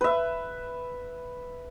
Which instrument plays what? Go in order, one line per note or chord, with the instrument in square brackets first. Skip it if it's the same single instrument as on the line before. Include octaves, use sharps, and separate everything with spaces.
[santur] B4 E5